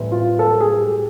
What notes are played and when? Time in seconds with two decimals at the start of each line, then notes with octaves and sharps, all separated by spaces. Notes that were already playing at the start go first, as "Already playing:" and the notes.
Already playing: A2 E3 G3 C4
0.12 F4
0.39 A4
0.60 G#4
0.81 G4